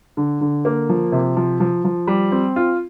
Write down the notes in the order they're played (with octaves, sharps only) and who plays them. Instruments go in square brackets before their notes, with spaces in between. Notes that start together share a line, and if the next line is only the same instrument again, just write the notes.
[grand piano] D3
D3
A#3
F3
C3
F3
F3
F3
G3
C4
F4